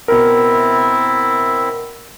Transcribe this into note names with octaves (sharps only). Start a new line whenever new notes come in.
B2 C4 E4 A#4 E5